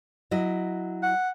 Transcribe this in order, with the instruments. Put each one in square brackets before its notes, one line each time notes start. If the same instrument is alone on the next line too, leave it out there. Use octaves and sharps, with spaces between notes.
[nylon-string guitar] F#3 E4 D#5
[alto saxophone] F#5